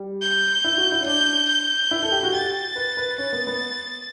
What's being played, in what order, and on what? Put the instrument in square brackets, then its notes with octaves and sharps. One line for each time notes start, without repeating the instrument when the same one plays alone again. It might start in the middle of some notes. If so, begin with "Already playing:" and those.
Already playing: [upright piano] G3
[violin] G6
[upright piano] E4
F#4
E4
C#4
[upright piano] D4 [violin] G6
[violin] G6
[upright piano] E4
A4
G4
F#4
[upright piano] G4 [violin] A6
[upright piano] B4
B4
[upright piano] C#4 [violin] A6
[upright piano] B3
B3